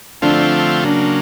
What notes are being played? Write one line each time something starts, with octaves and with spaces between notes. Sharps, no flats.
D3 F3 A3 C4 D4 F4
C#3 F#3 A#3 D4